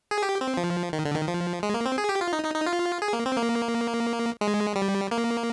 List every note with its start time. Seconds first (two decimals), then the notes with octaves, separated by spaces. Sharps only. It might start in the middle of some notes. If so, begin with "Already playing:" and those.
0.11 G#4
0.23 G4
0.41 C4
0.57 F3
0.93 D#3
1.05 D3
1.15 D#3
1.28 F3
1.63 G#3
1.74 A#3
1.86 C4
1.98 G#4
2.09 G4
2.21 F4
2.33 D#4
2.44 D#4
2.55 D#4
2.66 F4
3.02 G#4
3.13 A#3
3.26 C4
3.36 A#3
4.41 G#3
4.75 G3
5.11 A#3